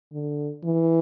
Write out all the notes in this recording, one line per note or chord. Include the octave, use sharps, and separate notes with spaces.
D3
E3